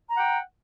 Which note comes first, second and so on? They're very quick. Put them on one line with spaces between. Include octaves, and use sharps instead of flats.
A#5 F#5 G5